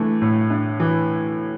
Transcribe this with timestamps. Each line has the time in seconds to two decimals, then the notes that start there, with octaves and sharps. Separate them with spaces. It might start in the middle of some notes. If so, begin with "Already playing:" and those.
Already playing: E3 A3 D4
0.22 A2
0.50 D4
0.80 E3